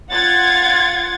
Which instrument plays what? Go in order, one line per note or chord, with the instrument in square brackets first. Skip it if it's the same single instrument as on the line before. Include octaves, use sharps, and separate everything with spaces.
[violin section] F4 F#5 G#6 A6